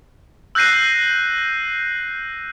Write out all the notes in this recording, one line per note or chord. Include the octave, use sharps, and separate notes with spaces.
E6 F#6 G6 A#6 C7 D#7